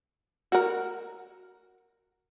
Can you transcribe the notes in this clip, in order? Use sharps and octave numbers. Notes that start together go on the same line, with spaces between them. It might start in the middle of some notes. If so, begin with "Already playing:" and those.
F#4 A#4